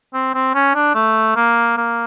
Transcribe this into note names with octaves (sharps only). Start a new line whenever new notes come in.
C4
C4
C#4
D4
A3
A#3
A#3